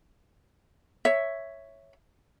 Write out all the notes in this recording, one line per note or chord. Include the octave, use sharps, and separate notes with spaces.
C#5 E5